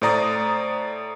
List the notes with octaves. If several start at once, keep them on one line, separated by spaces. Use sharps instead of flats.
A2 C5 D5 A#5 D#6 A6